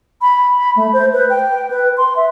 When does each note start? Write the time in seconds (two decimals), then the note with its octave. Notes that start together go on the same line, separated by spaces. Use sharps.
0.22 B5
0.57 B5
0.76 A3
0.93 C5
1.13 B4
1.30 G5
1.70 B4
1.97 C6
2.16 E5